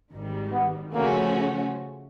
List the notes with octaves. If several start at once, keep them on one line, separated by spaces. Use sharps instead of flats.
G#1 G#2 D#3 G3
B3
C#3 F3 A3 A#3 C#4 F#4